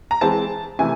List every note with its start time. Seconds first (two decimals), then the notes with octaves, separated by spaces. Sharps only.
0.11 A#5
0.21 E3 G#3 C4 A5
0.79 C3 E3 A3 G#5